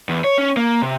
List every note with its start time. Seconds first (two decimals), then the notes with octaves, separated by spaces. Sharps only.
0.09 E2
0.24 C#5
0.38 C#4
0.57 A#3
0.82 C3